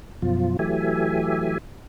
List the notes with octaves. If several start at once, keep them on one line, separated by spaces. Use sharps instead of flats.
F#2 B2 F3 F4
E3 F#3 A3 G4 E5 G#5